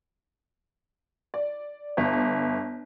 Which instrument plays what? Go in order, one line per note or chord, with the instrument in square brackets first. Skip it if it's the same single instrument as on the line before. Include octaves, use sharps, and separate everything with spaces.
[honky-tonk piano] D5
G1